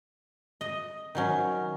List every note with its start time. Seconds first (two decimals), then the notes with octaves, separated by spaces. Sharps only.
0.61 D#5
1.15 D#3 F#3 C#4